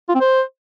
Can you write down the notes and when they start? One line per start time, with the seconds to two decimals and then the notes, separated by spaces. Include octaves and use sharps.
0.09 F4
0.15 C4
0.20 C5